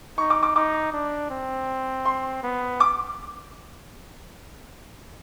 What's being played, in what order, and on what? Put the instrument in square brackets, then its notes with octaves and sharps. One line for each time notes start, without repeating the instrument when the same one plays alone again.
[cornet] D#4 [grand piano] C#6
[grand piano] D6
D6
[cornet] D#4 [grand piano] D6
[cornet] D4
C4
[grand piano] C6
[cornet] B3
[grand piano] D6